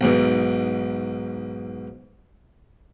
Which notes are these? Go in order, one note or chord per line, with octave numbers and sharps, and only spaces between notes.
B1 G#2 B2